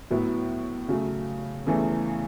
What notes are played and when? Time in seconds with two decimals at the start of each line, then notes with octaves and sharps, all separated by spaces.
0.10 A2 F#3 B3 E4
0.88 C#3 F#3 A3
1.66 E2 C#3 E3 A3